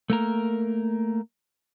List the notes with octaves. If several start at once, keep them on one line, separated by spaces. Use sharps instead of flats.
A3 A#3 A#4